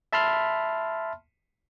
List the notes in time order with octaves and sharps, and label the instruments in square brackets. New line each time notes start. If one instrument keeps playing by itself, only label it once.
[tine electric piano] E5 A5 B5 C6 F6